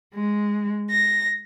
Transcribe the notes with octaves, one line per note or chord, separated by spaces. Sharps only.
G#3
A#6